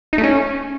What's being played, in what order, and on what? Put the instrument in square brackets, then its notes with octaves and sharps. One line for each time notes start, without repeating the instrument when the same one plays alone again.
[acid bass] D#4
A3
C#4